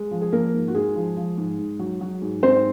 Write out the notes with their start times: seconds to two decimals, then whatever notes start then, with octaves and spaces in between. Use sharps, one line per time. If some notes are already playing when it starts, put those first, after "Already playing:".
Already playing: G#3
0.11 F3
0.21 G#4
0.32 F3 A#3 A#4
0.54 G#2
0.68 F#4
0.75 G#2 G#3 G#4
0.96 F3
1.17 F3
1.38 G#2
1.58 G#2
1.79 F#3
2.01 F#3
2.22 G#2
2.43 G#2 C4 C5